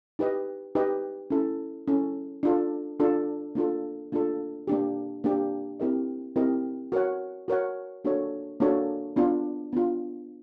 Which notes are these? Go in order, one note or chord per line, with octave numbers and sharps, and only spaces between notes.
D#4 G4 B4 D#5
D#4 G4 B4 D#5
C#4 E4 A4
C#4 E4 A4
D4 F4 A4
D4 F4 A4
A#3 D4 F4 A4
A#3 D4 F4 A4
A#3 D4 G4
A#3 D4 G4
C4 E4 G4 A#4 D#5
C4 E4 G4 A#4 D#5
F#4 A#4 C#5 F#5
F#4 A#4 C#5 F#5
A#3 D4 F#4 A4 C#5
A#3 D4 F#4 A4 C#5
B3 D4 F4
B3 D4 F4